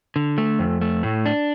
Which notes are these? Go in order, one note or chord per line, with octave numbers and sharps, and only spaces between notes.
D3
A3
F2
A3
A2
D4